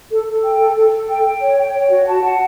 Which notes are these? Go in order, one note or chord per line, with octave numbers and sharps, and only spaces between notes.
A4
A4
G5
A4
A4
A4
G5
G5
C#5
G5
C#5
F#4
A5
F#5